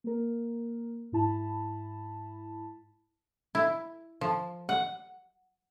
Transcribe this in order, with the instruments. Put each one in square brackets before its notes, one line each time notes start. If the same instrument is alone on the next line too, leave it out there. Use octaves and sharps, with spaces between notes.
[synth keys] A#3 A#4
G#2 E4 A5 B5
[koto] E4
F3
F#5